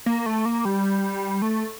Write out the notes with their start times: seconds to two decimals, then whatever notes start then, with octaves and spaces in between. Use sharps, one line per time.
0.06 A#3
0.26 A3
0.45 A#3
0.65 G3
1.42 A3